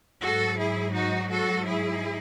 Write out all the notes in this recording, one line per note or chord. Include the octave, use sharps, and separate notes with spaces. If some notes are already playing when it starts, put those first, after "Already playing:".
G#2 F#3 F#4 A4
E4 G#4
D#4 F#4
F#4 A4
E4 G#4